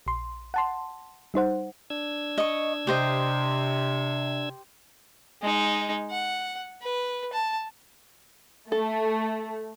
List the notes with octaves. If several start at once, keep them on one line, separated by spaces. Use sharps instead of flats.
A#1 C6
F#5 A5 C6
G3 D#4 C5 F#5
D4 E6 G#6
D#5 C#6
C3 G4 C5 D#5
G#3 D#4
F#5
B4
A5
A3 A4